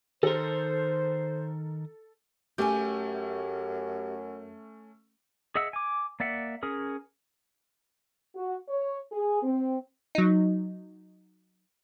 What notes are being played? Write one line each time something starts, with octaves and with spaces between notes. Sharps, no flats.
D#3 A4 A#4 C5
F#2 A3 C#4 G4 G#5 G6
G#4 D#5 E5 F#5 E6
G#5 D6
A#3 D5 E5 F#5
C#4 G#4 A#4
F#4
C#5
G#4
C4
F#3 D#4